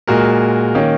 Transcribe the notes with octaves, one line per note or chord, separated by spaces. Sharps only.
A#2 G#3 F#4 A#4
D#3 A#3 C#4